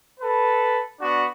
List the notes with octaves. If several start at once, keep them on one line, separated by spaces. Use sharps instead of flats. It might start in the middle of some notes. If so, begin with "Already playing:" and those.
A4 B4
B3 D4 F#4